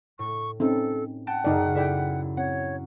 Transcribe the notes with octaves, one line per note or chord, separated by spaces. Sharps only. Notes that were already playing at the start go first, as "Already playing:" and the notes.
A2 C#6
C4 C#4 D#4 A4
F#5 G5 A5 G6
F#2 C#3 D#4 D5
E4 A4 D5 E5 G5
C4 C#5 F#5